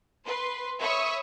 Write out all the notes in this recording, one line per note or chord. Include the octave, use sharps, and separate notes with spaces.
B4 C6
C#5 E5 B5 C#6 D#6